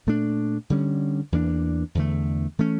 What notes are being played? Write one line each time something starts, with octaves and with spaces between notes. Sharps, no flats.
A#2 A3 D4
D3 G3 C#4
E2 E3 A#3 D4
E2 D3 A3
E3 A3 C#4